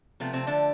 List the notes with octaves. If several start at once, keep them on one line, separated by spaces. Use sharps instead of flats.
C3 F3 A3 B3
C3 C4
D3 D4